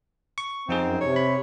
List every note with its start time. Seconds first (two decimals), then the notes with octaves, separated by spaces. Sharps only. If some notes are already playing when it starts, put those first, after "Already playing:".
0.38 C#6
0.69 F2 C4 D#4 G#4
0.80 F#2
1.01 C3 C#5
1.16 B5